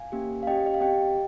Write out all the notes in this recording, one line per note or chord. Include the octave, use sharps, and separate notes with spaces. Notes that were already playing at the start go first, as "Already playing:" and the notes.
Already playing: F5 G#5
A#3 C#4 G4
F5
C#4 G4 D#5 G5
D#5
F5
C4 G4 D#5 G5